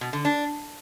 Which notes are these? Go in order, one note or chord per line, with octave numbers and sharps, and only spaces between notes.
B2
D3
D4